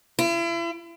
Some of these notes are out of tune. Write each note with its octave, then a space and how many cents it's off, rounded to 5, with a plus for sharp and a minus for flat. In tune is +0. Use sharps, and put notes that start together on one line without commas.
E4 +40